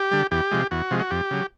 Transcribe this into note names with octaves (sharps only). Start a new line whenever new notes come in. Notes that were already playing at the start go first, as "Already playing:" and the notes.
Already playing: G4
D3 G3
E2 G4
C3 F3 G#3
E2 F#4
C3 F3 G#3
F#4
F2 G4
C#3 F#3